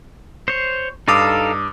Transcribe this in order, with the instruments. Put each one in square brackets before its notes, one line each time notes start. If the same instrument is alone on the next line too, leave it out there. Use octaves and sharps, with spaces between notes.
[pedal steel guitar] C5 C#5
[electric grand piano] G2 D6 D#6 [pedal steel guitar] D#4 A4 F5